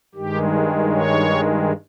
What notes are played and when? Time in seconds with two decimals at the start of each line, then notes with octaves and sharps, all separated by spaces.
0.15 G2 D#3 G#3 G4
0.93 C#5